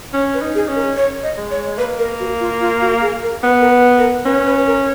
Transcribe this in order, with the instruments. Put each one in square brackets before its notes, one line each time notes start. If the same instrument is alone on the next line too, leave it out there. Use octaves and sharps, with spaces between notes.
[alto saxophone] C#4 [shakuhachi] C#5
[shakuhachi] B4
[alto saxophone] D#4
[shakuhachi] G#4
[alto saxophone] C#4
[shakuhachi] A#4
C#5
D#5
[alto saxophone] G#3
[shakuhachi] C#5
[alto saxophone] A#3 [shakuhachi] B4
[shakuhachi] A#4
F#4
F4
F4
F#4
G#4
A#4
[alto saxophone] B3 [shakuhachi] B4
[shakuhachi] A#4
B4
A#4
[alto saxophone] C#4 [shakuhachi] B4
[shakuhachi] B4
A#4